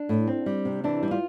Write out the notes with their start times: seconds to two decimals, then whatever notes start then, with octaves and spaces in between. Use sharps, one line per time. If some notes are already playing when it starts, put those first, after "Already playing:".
Already playing: D4
0.09 A2
0.27 C4
0.46 G3
0.65 C3
0.84 E3 D4
1.03 G3
1.11 F4